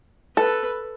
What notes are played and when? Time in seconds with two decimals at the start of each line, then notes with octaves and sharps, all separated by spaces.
0.36 A4 B4